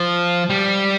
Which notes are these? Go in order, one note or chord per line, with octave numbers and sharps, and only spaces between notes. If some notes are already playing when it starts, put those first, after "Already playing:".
Already playing: F3
G3